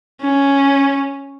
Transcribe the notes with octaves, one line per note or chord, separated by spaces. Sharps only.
C#4